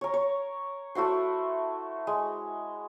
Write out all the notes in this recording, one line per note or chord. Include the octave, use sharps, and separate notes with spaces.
A#4 C#5
C#5
A3 E4 F#4 C5
G#3